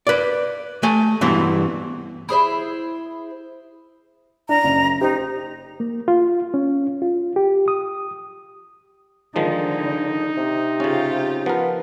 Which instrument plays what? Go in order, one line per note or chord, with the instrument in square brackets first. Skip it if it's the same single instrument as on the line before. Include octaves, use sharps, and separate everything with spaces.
[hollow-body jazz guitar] B4 D5
A3 G#5
G2 B2 E3 C4
[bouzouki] E4 G#4 C5 E5
[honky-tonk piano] D4 [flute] A#5
[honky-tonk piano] F#1
[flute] D#4 [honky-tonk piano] G4 C5
[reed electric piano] A#3
F4
C#4
F4
G4
D#6
[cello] D3 [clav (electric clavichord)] D#3 F3 G#3 [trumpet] D#4
[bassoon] C3
[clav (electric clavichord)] C#3 C#4 [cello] F4 G4
[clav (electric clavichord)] F3 A#4 [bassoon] B3